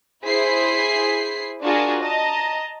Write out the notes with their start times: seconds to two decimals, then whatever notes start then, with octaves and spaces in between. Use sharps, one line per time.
0.23 E4 G#4 C5 B6 C7
1.61 D4 F4 F#4 G#4 A#4 A5
2.02 D#5 A5 A#5